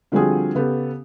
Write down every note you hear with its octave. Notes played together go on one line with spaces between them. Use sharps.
D3 F3 G3 C4 F#4 G#4
C#3 B3 G4 A4